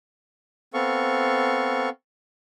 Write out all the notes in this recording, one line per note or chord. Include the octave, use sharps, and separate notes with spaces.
B3 C4 A4 F5 C#6